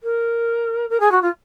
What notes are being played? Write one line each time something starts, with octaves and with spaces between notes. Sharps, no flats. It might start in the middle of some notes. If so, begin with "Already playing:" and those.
A#4
A#4
G#4
F#4
F4